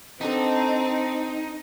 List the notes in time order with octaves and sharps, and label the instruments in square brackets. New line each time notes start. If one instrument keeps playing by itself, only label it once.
[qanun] B3 D4 A4 [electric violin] C4 [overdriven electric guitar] D#4